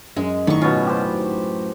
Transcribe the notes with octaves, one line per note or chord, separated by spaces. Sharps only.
F#2 G#3
G#1 F#2 A2 D#3 C#6
B2 C#4 F4
G4 C5